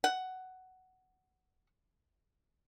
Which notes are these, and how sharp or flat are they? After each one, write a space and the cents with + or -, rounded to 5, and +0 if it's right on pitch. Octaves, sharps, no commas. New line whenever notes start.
F#5 +10